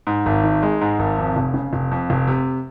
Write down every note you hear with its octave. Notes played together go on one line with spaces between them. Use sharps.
G#2
G#1
D#3
G#3
G#2
G#1
F2
F1
C#3
F1
F2
F1
C3